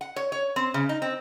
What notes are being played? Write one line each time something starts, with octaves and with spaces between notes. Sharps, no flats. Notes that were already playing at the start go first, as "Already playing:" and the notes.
F#5
C#5
C#5
C4
C#3
D#4
C4